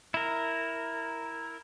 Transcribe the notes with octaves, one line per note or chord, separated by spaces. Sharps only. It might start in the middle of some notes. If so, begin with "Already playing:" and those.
E4 A#4